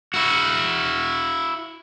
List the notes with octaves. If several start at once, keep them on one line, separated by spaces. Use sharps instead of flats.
E4 F#4